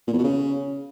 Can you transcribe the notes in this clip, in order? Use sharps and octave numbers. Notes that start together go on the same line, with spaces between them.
A#2
E2
B2
C#3